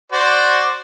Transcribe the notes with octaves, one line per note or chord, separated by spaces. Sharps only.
F#4 C5 D5